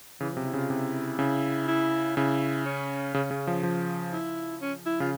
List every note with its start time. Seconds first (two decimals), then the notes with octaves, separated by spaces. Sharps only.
0.20 C#3 E3
0.33 C3 F3
0.45 E4
0.53 C#3
0.57 F4
0.70 C3 E4
1.19 C#3 E4
1.68 E4
2.16 C#3 E4
2.66 C#4
3.14 C#3 C#4
3.31 C#3
3.47 F3
3.63 F3
4.12 E4
4.62 C#4
4.86 E4
5.00 C#3 F4